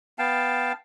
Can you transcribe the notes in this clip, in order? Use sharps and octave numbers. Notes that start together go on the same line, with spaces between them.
B3 F5 G5 A5